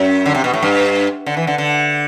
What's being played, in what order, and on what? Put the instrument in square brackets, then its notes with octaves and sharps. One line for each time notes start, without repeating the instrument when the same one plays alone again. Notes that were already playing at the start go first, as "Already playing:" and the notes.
Already playing: [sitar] F#2
D3
C3
B2
A2
G2
D3
E3
D3
D3